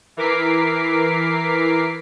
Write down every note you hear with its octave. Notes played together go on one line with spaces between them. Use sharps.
E3 A#4 D6 B6 C7